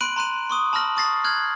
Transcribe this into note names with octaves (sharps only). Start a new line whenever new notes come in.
B5 C6 F#6 D7 D#7 F#7
A#5 C6 F#6 D#7
C6 C#6 D#6 D#7
A5 B5 E6 F6 A#6 F#7
C#6 D#6 A6 A#6 C7
F6 F#6 G#6 F#7